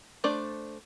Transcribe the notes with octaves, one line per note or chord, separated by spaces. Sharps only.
A3 D4 C5 D5